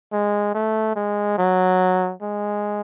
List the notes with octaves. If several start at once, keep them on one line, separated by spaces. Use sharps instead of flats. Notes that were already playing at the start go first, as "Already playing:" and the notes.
G#3
A3
G#3
F#3
G#3